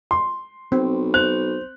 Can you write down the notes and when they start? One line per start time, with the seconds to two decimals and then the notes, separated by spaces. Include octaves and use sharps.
0.11 C6
0.72 B1 C4
1.14 C5 F#6